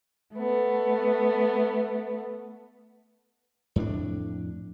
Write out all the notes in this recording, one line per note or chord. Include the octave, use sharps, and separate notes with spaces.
A3 B3
F2 A2 C4 D4